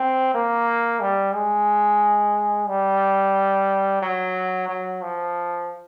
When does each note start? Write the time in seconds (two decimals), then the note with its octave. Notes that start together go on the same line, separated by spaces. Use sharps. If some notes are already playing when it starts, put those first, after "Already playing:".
Already playing: C4
0.34 A#3
1.01 G3
1.34 G#3
2.68 G3
4.02 F#3
4.69 F#3
5.02 F3